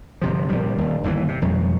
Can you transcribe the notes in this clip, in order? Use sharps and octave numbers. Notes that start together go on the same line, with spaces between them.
G1 C3 F3
A#1 F3 G3
D#1 D#2
G1 D#2 B2 E3
C3
E1 F2 F#3 G#3